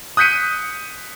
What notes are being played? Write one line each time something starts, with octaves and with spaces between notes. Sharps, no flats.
D#6 F#6 G6 B6 C#7 D#7